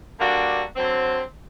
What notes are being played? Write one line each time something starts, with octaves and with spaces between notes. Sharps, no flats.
D3 G3 A#3 D4 F#4
D3 F#3 C4